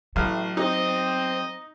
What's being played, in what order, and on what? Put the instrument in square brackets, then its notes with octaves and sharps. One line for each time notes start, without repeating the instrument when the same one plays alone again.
[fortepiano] A1 F5 [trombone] A2 [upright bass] F#3
[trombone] C4 [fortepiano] D#4 [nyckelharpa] D#5